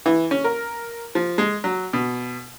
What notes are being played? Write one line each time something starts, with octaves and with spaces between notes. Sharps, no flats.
E3
C#4
A#4
F3
G#3
F#3
B2